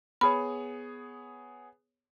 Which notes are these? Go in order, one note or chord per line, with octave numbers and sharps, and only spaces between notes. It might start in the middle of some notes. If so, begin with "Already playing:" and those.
B3 G#4 C#5 B5